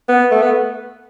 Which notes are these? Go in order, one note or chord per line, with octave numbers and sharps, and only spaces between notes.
B3
A3
B3